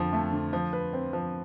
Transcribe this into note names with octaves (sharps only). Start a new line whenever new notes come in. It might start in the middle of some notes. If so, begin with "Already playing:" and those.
Already playing: F2 D3 F3
A3
D3
F3
B4
C4
F3